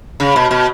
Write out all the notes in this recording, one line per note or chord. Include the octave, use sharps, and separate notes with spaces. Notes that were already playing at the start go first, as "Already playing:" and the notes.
C#3
B2
B2